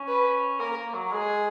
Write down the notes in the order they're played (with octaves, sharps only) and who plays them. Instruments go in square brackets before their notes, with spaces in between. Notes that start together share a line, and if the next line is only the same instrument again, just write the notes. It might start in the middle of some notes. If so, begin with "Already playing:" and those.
Already playing: [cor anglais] C#4
[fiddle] B4
[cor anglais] A#3 [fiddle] A#4
[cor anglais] A#3
F#3
[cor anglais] G#3 [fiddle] G#4